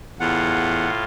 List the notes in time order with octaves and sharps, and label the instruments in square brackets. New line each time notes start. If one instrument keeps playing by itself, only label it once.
[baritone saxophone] E2 [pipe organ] A2 F4 [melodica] F#5